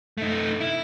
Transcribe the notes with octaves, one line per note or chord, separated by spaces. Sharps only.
A3 D#4
E4